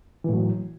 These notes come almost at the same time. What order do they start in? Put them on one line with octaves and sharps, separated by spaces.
E3 A2 F#3